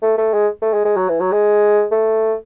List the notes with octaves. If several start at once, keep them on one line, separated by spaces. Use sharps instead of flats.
A3
A3
G#3
A3
G#3
G#3
F#3
E3
F#3
G#3
A3